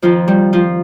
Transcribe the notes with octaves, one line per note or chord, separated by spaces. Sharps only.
F2 D#3 F3 F4
G3 G4
F3 F4